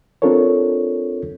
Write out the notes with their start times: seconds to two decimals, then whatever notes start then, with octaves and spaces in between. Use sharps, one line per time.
0.22 C4 D4 F4 A4 A#4 C#5